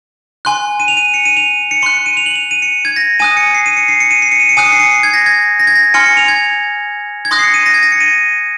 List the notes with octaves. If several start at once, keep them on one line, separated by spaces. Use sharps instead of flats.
G#5 C6 F#6
D#7
F7
D#7
C#7
D#7
F7
C#7
C6 F#6 C#7
C#7
D#7
F7
F#7
F7
D#7
C#7
G#6
A#6
G#5 D#6 F#6 D#7
C#7
C7
D#7
C#7
C7
C#7
D#7
C7
C#7
D#7
C#7
G#5 D#6 F#6 D#7
C#7
C7
C#7
C7
G#6
A#6
G#6
A#6
G#6
A#6
G#5 C6 F6 C#7
C#7
F7
G#6
G#6
C6 D#6 F#6 A#6
C7
C#7
D#7
A#6
G#6
A#6
C#7
D#7